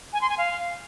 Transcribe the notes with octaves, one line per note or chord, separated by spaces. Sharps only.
G#5
C6
G#5
F5